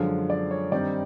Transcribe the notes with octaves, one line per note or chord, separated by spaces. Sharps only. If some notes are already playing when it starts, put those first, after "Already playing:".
Already playing: F#2 D3 F3 G#3 F5
D5
C#5
G2 D#3 G3 C4 D#4 D5